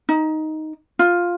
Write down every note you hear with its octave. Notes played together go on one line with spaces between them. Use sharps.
D#4
F4